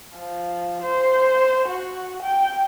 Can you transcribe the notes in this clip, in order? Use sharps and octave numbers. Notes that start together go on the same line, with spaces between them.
F3
C5
F#4
G5